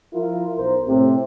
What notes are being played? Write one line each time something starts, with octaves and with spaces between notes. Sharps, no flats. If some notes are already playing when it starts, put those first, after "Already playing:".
F3 E4 F4 A#4
B1 A#4 C5
A2 C3